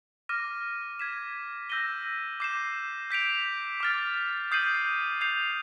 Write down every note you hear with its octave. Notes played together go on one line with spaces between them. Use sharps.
D6 F6 A#6 D#7
G#6 B6 E7
E6 G6 A#6 D#7 G7
D6 G6 C7 E7
G6 B6 D7 F7
D6 F6 A6
D#6 G6 C7 D#7 F#7
G6 C7 F7